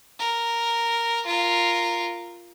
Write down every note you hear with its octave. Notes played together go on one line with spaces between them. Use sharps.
A#4
F4 A#4